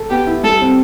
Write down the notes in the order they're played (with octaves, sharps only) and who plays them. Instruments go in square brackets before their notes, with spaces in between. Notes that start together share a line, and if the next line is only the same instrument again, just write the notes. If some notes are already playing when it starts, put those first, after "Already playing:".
Already playing: [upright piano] A4
[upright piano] B3 [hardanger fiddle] G4
[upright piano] E4
[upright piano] G3 [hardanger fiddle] A4
[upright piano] C4